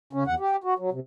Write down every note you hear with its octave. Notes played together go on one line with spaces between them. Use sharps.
C#3 C#4
E2 F#5
G4
F#4
F#3
C3